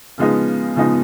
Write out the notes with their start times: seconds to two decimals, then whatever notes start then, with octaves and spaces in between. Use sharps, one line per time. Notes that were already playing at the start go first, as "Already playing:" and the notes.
0.18 C#3 F3 G#3 B3 D#4
0.76 C#3 F3 G#3 B3 D#4